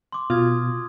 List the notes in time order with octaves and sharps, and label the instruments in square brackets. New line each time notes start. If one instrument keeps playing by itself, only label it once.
[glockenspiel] C6 D6
[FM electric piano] B2 [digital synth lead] F4 [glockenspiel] D#6 G#6